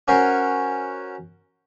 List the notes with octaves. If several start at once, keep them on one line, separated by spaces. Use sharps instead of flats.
C#4 F#4 A#4 C5